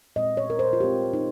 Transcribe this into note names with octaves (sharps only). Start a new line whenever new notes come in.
A#2 G#3 C4 D#5
C#5
A#4
C5
F4
A#2 G#3 C4 G4
D#4